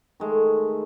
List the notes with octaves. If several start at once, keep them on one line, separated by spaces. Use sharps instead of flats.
D#3 G#3 A3